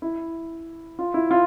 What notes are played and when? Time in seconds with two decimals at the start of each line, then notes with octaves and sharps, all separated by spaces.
0.02 E4
0.99 F4
1.14 E4
1.31 F4